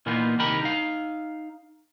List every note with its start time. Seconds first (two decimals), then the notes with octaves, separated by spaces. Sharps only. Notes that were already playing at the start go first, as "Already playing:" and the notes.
0.06 A#2 E3 A#3 B3 D#4 F4
0.39 C2 D#3 D#4 G4 A#4 B5
0.63 D#4 F5